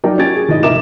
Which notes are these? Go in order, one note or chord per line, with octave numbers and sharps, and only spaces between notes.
F#3 D#4 G4 A#4 D5
C#4 F#4 G4 G#6 A6 D7
G#4
G#1 A2 D#5
F1 A#4 E5 D6 E7